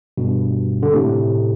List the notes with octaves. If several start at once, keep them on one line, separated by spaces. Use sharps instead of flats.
G2 B2
D3
A2 C3